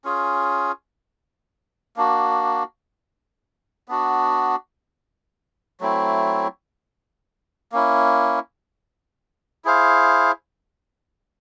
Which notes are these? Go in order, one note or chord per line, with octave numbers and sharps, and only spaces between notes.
C#4 F4 G#4
A#3 D4 F#4
B3 D4 F#4
F#3 A3 C4 E4
A#3 C#4 E4
E4 G#4 C5 F5